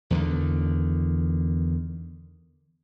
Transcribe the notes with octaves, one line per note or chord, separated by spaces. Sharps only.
E2 D3 D#3